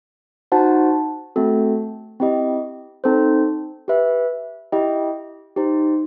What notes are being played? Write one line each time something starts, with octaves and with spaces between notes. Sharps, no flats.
D#4 F#4 C5 F#5 A5
A3 C4 F#4 A4
C4 E4 G4 D#5
C4 D#4 A4 C5
G4 B4 E5
E4 G4 D#5 G5
D#4 G4 C5